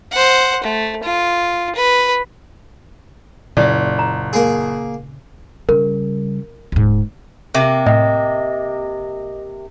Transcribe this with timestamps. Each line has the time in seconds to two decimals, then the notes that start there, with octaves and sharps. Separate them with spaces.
0.12 C5 F#5
0.63 A3
1.03 F4
1.75 B4
3.57 F#1 A#2 C#3 D5
3.99 A#5
4.33 A#3 G#4
5.69 C#3 G3 A#4
6.72 D1 G#2
7.55 C3 A#3
7.86 A2 D#5